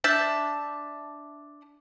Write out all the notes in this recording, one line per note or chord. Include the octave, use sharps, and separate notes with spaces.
D4 E5 A5 G6